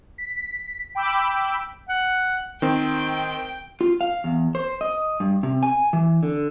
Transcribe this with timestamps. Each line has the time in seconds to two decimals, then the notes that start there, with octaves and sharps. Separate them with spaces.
0.18 B6
0.95 G5 B5 D6 E6
1.89 F#5
2.62 D#3 C4 G5
3.81 F4
4.01 F5
4.24 E2
4.55 C5
4.81 D#5
5.20 G2
5.43 C3
5.63 G#5
5.93 E3
6.23 D3